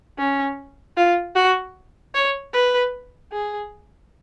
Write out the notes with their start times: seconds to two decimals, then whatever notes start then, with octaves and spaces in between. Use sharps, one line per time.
0.18 C#4
0.97 F4
1.35 F#4
2.15 C#5
2.54 B4
3.32 G#4